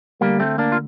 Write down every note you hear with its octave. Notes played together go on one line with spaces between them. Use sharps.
D2 D3 G3 A#3
A3 C4
A#3 D4
F4